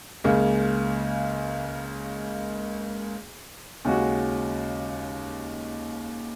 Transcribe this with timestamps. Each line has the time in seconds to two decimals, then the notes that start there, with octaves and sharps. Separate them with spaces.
0.24 C#2 C#3 A#3
3.85 D#2 C#3 G#3 C#4 F#4